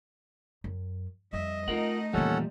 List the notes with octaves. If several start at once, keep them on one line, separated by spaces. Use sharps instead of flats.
F#2
F2 G3 D#5 E5
A3 C4 D#4 F4 A#4 F#5
E2 A#2 D#3 E3 G3 C#4 A4 F#5